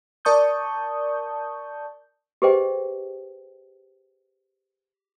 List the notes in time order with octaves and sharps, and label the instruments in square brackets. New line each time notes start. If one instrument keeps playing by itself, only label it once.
[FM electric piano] A#4 D5 A5 C#6 D#6 G6
[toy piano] G4 G#4 B4 C5 D#5 G5